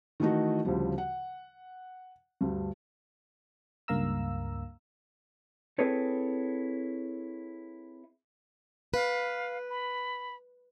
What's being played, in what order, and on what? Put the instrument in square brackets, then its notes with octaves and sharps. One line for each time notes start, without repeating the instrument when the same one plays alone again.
[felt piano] D#3 E3 A3 D#4 F#4
D2 C#3 F3 G3
F#5
D2 G2
[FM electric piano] C#2 G2 A#3 F5 A#5 E6
[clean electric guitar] C4 E4 G#4 A4 B4 C#5
[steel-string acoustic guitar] B4 [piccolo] F5
[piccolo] B5